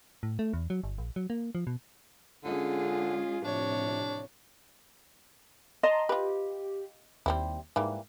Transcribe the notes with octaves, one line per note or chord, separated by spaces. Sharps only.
A2
A3
E2
F#3
G1
A#1
F#3
A#3
F3
B2
D3 G#3 C#4 F4 G#4
A2 C3 F3 D4 C#5
D#5 A5 A#5 C6
F4 G4 B4
D#2 G3 C4 E4
G#2 E3 G3 A#3